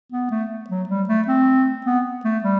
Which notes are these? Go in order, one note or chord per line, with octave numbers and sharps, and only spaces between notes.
B3
A3
F#3
G3
A3
C4
B3
A3
G3